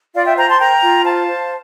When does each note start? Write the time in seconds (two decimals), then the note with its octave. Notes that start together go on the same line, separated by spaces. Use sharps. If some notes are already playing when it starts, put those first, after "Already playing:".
0.15 F4 D5 F5
0.26 E5 G5
0.37 C5 G5 A#5
0.48 A5 C6
0.59 A#4 G5 A#5
0.83 F4
1.04 C5 F5 A5
1.27 C5